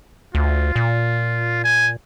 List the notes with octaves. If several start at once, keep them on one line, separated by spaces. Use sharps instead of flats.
D2 F4
A#2
G#5